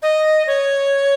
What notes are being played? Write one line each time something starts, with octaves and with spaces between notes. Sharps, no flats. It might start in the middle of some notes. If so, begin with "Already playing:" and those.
D#5
C#5